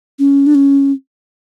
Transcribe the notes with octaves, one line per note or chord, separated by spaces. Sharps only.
C#4
D4
C#4